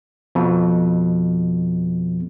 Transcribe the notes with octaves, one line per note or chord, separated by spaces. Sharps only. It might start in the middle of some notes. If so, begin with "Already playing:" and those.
F2 B2